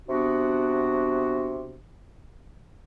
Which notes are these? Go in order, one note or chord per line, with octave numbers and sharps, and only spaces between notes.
C3 B3 D4 F#4